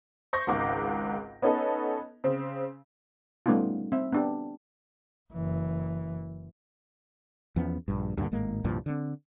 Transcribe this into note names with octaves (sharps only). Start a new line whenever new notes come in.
C5 C#6 G6 A#6
G#1 C#2 G#2 D6
B3 C#4 D#4 A4 B4 D#5
C#3 C4
G3 A3 B3 C#4 D#4 F4
C4 E5
B3 D4 G4
F#1 E3
E2 F3 B3 C#4
A#1 G2
D2 G2 A#2 D3
G#1 A2 G#3 A#3
C2 G2 A#2 F3
D3 C4